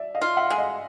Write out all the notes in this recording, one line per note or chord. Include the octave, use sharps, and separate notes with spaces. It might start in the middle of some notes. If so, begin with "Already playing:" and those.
Already playing: D5 E5
D#5 F5
F4
E5 F#5
G#3
D#5 F5